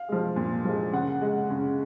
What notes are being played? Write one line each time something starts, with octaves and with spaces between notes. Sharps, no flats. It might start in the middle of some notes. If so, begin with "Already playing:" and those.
Already playing: F5
F3 G#3
A#2
F3 G#3
C#3 F#5
G#3
C#3